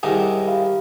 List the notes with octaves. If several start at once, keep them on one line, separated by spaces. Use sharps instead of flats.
C2 G#2 D#3
G4 F5 B5